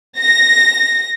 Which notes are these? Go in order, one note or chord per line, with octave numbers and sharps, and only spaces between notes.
A#6